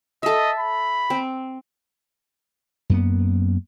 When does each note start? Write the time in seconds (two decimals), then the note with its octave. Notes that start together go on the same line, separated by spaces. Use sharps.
0.23 A4 D#5 E5
0.60 B5
1.10 C4
2.90 F#2 A#3 B3